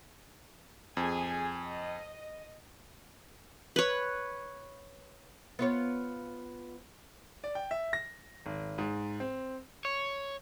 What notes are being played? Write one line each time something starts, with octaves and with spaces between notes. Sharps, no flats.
F2 G#4 G#5
D#5
B4 C#5
B3 F4 C#5
D5
G5
E5
A#6
G#1
G#2
C4
C#5